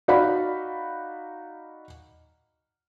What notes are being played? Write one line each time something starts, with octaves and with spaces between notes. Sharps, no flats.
D#4 F#4 D5 F5 F#5 B5